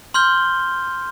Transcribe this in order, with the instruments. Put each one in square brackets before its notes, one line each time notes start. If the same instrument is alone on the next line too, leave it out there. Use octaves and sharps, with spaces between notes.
[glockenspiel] C6 F6 G6 G7